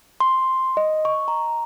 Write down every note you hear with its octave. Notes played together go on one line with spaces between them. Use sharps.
C6
D#5
C#6
A#5